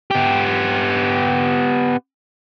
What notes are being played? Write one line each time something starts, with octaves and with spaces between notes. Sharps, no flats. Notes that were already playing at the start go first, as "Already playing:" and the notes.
B3 G4